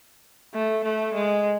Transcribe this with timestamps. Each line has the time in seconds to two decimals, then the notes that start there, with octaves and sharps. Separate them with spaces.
0.54 A3
0.84 A3
1.14 G#3